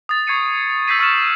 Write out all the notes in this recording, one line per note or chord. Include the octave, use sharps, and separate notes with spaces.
D#6 A6
C#6 G#6 C7 C#7 D#7
E6 G6 A6 B6 C7 D#7
C#6 E6 F6 A6 D#7 E7